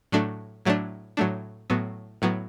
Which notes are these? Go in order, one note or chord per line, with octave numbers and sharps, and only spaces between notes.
A2 F#3 A3 D4
A2 F#3 A3 D4
A2 F#3 A3 D4
A2 F#3 B3
A2 F#3 B3